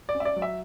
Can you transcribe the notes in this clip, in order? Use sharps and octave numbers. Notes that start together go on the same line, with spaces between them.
D5
C#4
E5
D5
F#3
E5